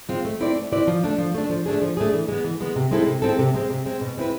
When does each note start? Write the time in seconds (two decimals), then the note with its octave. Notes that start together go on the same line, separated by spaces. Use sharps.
0.09 G#3 C4 F4
0.25 A3
0.40 C4 E4 B4 D5
0.56 A3
0.72 C4 E4 B4 D5
0.87 F3
1.04 A3 D4
1.18 F3
1.34 A3 D4
1.50 F3
1.66 A3 D4 G#4
1.82 F3
1.97 A3 D4 G#4
2.14 E3
2.28 G#3 B3
2.44 E3
2.60 G#3 B3
2.76 C3
2.91 G#3 C4 E4 A4
3.07 C3
3.22 G#3 C4 E4 A4
3.39 C3
3.54 G#3 C4
3.70 C3
3.86 G#3 C4
4.01 B2
4.17 G#3 C4 E4 B4